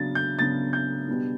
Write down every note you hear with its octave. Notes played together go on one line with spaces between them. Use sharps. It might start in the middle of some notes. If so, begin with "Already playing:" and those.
Already playing: C#3 F#3 B3 D4 A6
G6
C#3 F#3 B3 D4 A6
G6
B2 G3 B3 D4